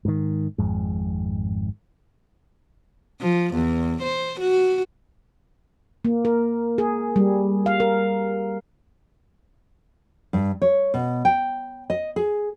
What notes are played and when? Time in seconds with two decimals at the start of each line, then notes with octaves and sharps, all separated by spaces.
0.05 G#2 D#3
0.58 G#1 F2 G#2
3.21 F3
3.54 E2
4.02 C5
4.40 F#4
6.05 A#3
6.25 A#4
6.78 G#4
7.16 G3
7.66 F5
7.80 A#4
10.33 G2
10.62 C#5
10.94 B2
11.25 G5
11.90 D#5
12.16 G#4